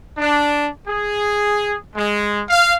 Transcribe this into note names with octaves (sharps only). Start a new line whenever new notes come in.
D4
G#4
G#3
F5